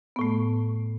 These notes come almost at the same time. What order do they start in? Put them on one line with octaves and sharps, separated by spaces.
B3 A2 A3